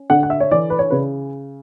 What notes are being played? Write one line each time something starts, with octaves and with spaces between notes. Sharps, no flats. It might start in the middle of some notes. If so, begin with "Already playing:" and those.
Already playing: C#4
D3 F#5
F#5
E5
C#5
E3 D5
B4
C#5
C#3 B4